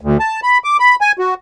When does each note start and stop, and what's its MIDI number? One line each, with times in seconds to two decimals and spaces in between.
0.01 0.17 38
0.20 0.40 81
0.43 0.58 83
0.64 0.77 86
0.80 0.95 83
1.01 1.12 80
1.19 1.34 66